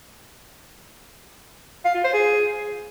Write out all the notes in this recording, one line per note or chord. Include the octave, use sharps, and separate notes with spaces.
F5
F4
C5
G#4